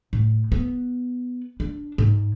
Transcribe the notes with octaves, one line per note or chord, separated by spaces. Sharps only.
A2
B3
D4
G#2